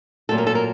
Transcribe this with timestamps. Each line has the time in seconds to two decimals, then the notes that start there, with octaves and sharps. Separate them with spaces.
0.29 A#2 F#3 A3 A4
0.38 A#4
0.47 A4
0.55 A#4